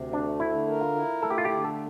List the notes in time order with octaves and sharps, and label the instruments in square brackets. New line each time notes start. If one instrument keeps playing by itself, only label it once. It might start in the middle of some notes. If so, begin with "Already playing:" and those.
Already playing: [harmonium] D2 C3
[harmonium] A3 [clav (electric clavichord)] D4
[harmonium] D3 [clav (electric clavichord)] E4
[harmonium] A#4
[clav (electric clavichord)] F4
[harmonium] E4
[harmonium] A3 [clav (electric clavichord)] A4
[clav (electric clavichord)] G4
F4
G4
[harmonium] D3
[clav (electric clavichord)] A4